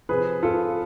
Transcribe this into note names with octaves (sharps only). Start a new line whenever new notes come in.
C3 F3 G#4 B4
F4 A4